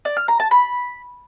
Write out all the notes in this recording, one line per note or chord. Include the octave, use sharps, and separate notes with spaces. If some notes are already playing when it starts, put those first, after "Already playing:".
D5
F6
A#5
A5
B5